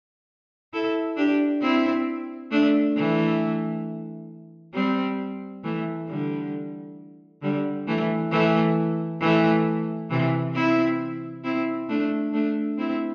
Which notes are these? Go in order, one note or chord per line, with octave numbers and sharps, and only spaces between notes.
E4 A4
D4 G4
C4 E4
A3 D4
E3 A3
G3 C4
E3 A3
D3 G3
D3 G3
E3 A3
E3 A3
E3 A3
C3 E3
C4 E4
C4 E4
A3 D4
A3 D4
C4 E4